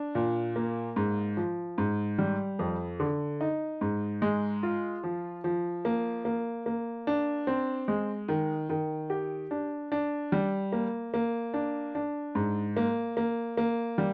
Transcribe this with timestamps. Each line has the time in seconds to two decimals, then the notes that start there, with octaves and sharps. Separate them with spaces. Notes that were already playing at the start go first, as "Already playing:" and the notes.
Already playing: D4
0.15 A#2
0.56 A#3
0.96 G#2
1.37 F3
1.78 G#2
2.19 G3
2.59 F2
3.00 D3
3.41 D#4
3.81 G#2
4.22 G#3
4.63 F4
5.03 F3
5.44 F3
5.85 A#3
6.25 A#3
6.66 A#3
7.07 D4
7.47 C4
7.88 G#3
8.28 D#3
8.70 D#3
9.10 G4
9.51 D4
9.92 D4
10.32 G3
10.72 A#3
11.14 A#3
11.54 D4
11.95 D4
12.35 G#2
12.77 A#3
13.17 A#3
13.57 A#3
13.98 G3